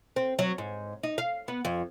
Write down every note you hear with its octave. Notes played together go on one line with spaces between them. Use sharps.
C4
F#3
G#2
D#4
F5
B3
F2